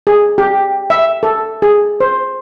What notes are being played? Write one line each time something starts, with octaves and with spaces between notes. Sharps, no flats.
G#4
G4
E5
A4
G#4
C5